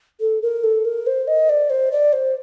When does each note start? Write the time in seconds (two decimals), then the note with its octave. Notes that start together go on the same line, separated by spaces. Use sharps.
0.21 A4
0.42 A#4
0.64 A4
0.85 A#4
1.07 C5
1.28 D#5
1.49 D5
1.70 C5
1.92 D5
2.13 C5